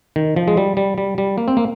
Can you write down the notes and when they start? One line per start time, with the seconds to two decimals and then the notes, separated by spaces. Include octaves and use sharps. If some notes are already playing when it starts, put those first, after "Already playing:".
0.16 D#3
0.36 F3
0.48 G#3
0.57 G3
0.77 G3
0.98 G3
1.18 G3
1.38 A#3
1.48 C4
1.57 A#3